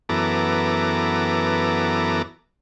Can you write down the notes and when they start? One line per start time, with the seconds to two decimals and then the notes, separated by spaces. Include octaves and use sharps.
0.09 F#2 E3 B3 A4 A#5 D6